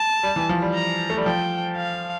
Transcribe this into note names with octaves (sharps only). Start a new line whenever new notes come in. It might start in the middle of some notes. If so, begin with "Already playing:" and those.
Already playing: A5
G3
E3
F3
G3
A#5
A3
G3
F3 G5
F5